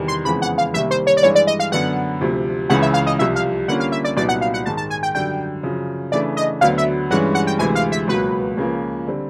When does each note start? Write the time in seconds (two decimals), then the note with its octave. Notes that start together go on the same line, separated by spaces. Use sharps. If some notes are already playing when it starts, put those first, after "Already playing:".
Already playing: E2 C3 D#3 G3
0.08 C6
0.25 F2 C#3 E3 G#3 B3 B5
0.42 F#5
0.58 F5
0.74 C2 C3 D#3 G3 A#3 E5
0.91 C5
1.07 C#5
1.17 D5
1.23 G2 E3 G#3 C#5
1.35 D5
1.47 D#5
1.60 F5
1.72 F#2 D3 F#3 B3 F#5
2.21 D2 C3 F3
2.70 C#2 C#3 E3 F#5
2.82 E5
2.94 F5
3.07 D#5
3.19 C2 C3 F3 E5
3.36 F5
3.68 D3 G3 A#3 C#4 F4 F#5
3.80 F5
3.92 E5
4.04 D5
4.17 C2 A#2 F#3 B3 D#4 D5
4.29 F#5
4.41 F5
4.54 F#5
4.65 G#2 D#3 G#3 A5
4.77 A5
4.90 G#5
5.03 G5
5.15 F#2 D3 G3 G5
5.63 F#2 C#3 F3
6.12 C#3 E3 A3 D4 D5
6.37 D#5
6.61 D2 D3 F#3 B3 F5
6.78 E5
7.10 G2 E3 G#3 C#4 F#5
7.35 F#5
7.47 G5
7.59 D2 C3 E3 G#3 G#5
7.75 F5
7.92 E5
8.08 C#2 B2 F#3 A#3 B4
8.57 C#2 C#3 F3 A#3
9.07 D3 G3 C4